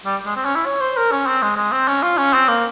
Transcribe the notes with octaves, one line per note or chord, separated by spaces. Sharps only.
G3
G#3
C4
C#4
E4
C#5
C5
A#4
C#4
C4
G#3
G#3
C4
C#4
F4
C#4
C4
A#3